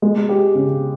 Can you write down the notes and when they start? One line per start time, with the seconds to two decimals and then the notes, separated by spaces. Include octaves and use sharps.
0.02 G#3
0.29 G4
0.55 C#3